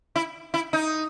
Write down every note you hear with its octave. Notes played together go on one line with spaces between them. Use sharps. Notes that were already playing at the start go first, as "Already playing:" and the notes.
E4
E4
D#4